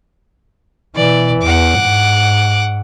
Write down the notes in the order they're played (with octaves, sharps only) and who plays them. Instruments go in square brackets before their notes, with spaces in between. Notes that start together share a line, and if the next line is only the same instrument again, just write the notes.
[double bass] B2 E3 [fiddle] D5
[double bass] E2 [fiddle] F#5 D6
[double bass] G#2